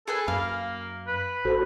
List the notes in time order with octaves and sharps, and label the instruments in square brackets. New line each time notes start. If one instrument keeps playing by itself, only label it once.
[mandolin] G#4 B4 G#5 [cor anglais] A4
[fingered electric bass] F#2 [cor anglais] A#3 [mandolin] F5
[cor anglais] B4
[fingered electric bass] A1 [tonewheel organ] F#4 A4 C5